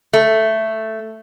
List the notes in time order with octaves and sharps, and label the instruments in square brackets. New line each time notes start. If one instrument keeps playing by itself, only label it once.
[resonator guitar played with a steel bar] A3